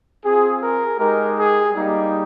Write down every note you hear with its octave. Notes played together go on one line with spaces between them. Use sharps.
C4 F4 G#4
A#4
G#3 D#4 G4 A#4
G#4
G3 A#3 D#4 G4